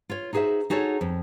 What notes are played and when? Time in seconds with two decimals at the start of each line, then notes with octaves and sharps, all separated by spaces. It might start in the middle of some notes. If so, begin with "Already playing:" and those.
0.10 F4 C#5
0.33 D#4 F#4 G#4 B4 C5 E5
0.70 D#4 F#4 G#4 A4 C#5
1.01 F2